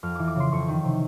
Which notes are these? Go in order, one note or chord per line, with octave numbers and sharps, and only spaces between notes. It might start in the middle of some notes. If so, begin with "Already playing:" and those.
F2 F6
E3 D6
D6
C#3 C6
F2 C#6
D#3
C3